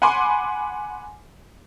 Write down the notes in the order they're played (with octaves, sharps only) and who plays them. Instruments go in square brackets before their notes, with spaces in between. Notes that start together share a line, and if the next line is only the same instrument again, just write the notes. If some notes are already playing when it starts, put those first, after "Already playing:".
[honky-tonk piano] F#5 G#5 B5 C6 D6